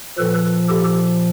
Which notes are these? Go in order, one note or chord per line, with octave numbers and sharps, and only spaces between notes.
A#2 F3 A4 B4
G4 A4